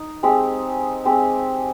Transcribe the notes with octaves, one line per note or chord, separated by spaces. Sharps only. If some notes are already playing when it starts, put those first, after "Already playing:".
Already playing: D#4
G#3 C4 G4
G#3 C4 G4